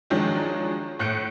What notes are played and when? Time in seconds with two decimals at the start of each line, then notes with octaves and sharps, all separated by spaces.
0.10 D#3 F3 F#3 G#3 D4
0.99 A2 F#6 G6 C#7 D7